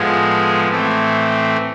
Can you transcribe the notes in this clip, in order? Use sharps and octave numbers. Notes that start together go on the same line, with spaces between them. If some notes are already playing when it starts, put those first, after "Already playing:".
Already playing: A2 F3 G#3 B3 G#4
A2 E3 A3 C4